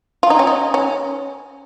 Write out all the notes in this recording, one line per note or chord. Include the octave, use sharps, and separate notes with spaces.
F4
D#4
C#4
D#4
C#4